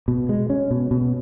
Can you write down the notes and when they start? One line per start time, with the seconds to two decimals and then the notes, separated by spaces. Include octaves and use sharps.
0.08 B2
0.29 G#3
0.50 C#4
0.71 B2
0.91 B2